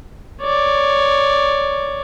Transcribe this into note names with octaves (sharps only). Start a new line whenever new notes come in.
C#5 D5